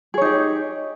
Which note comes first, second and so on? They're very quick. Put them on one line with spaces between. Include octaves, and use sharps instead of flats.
G#4 C#5 D#4 G4